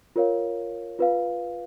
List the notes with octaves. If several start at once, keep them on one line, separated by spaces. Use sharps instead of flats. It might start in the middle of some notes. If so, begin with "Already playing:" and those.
F4 A#4 C#5 F5
F4 B4 F5